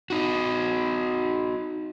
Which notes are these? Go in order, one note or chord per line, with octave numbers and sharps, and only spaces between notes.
D#4 F#4